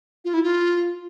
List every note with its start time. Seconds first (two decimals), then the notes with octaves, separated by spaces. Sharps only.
0.25 F4
0.34 E4
0.43 F4